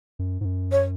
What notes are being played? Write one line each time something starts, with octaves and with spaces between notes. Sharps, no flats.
F#2
G#2
F#2
C#5